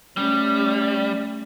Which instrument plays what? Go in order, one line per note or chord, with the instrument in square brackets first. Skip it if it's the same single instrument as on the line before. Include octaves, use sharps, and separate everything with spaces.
[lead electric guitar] G3 [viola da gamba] A3 C#4